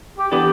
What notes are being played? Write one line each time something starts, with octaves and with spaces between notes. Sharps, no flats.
G4
E3 B3 D4 G4 A4